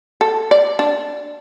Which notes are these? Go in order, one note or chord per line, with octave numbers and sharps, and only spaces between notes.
A4
D5
D4